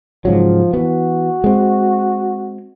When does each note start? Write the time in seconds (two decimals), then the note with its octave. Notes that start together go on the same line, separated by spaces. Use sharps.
0.25 G#2 C#3 F3 F#3
0.73 E3 B3 F#4
1.44 G#3 C4